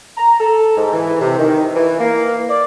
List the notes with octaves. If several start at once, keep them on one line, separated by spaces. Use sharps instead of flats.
A#5
A4
G#2
E3
C3
D#3
E3
A#3
D5